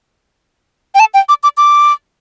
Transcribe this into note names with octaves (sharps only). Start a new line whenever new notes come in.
G5
A5
G5
D6
D6
D6